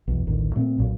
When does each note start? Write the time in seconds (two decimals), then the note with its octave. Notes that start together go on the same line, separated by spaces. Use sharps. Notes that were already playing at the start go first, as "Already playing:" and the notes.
0.08 B1 E2
0.27 A1 D2 D#3
0.56 A#2 A3 C4
0.78 B1 A#2